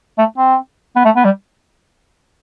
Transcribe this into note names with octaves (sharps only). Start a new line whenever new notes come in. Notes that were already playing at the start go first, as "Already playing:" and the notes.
A3
C4
B3
A3
B3
G3